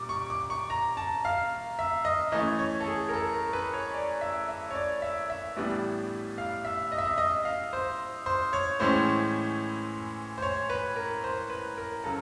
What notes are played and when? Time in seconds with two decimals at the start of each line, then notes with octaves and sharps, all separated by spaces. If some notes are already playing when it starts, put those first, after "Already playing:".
Already playing: A#2 G3 D6
0.09 C#6
0.30 D6
0.50 C#6
0.70 A#5
0.97 A5
1.25 F5
1.79 E5
2.05 D#5
2.32 E3 A3 C#4 D#5
2.59 C#5
2.80 A4
2.86 G#4
3.09 A#4
3.14 A4
3.34 A#4
3.53 B4
3.73 C#5
3.94 D5
4.21 E5
4.49 E5
4.70 C#5
4.75 D5
5.02 E5
5.30 E5
5.56 A2 E3 G3 B3 D4
6.38 F5
6.65 E5
6.92 D#5
6.98 E5
7.05 D#5
7.18 D#5
7.45 F5
7.73 C5
8.26 C5
8.53 C#5
8.80 A2 E3 G#3 C#4 C5
10.38 C5
10.42 C#5
10.70 B4
10.96 A#4
11.24 C5
11.50 B4
11.78 A#4
12.04 C#3 F#3 A4